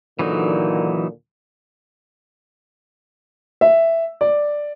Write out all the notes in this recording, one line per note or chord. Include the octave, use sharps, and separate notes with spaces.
D#2 A#2 D3 E3 F#3 D#4
E5
D5